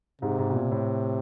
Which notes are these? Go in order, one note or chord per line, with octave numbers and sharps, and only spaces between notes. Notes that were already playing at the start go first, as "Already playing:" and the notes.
G#2 C3
G#2
B2
A#2
A2